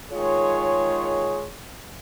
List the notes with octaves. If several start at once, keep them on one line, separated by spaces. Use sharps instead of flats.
D#3 G#3 F4 G#4 C#5